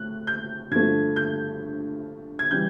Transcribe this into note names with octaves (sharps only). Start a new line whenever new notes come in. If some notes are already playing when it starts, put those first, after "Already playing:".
Already playing: A2 F#6
G6
G2 D3 F3 A3 G#6
G6
G#6
C#3 E3 G3 G6